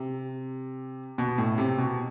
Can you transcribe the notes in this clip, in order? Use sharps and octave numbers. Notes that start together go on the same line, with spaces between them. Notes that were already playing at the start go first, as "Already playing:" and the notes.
Already playing: C3
B2
A2
C3
B2